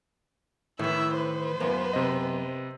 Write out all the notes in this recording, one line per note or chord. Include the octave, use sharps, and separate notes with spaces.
A2 D#3 E3 E4 E5
B4 C5
F#2 A#3 B3
C3 D#5